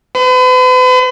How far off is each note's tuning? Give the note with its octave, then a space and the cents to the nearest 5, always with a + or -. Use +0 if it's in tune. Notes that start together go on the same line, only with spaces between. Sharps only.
B4 +45